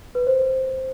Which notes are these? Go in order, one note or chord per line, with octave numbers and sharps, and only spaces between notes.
B4
C5